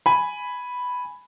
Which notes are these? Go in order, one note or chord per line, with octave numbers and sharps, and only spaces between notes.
G#5 B5